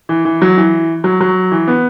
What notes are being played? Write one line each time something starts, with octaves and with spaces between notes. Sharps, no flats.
E3
E3
F#3
E3
F#3
F#3
E3
B3